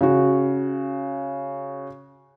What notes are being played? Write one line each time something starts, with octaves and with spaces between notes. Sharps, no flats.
C#3 F#4